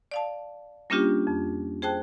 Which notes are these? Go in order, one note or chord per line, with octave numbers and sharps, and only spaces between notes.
D5 F5 A5
G3 A#3 C#4 D4 F4 G4
F2
G#4 C5 G5 A5 F#6